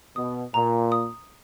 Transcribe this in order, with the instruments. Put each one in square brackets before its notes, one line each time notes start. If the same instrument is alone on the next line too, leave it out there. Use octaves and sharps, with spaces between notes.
[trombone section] B2 [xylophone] D#6
[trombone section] A#2 [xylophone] A#5
[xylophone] D#6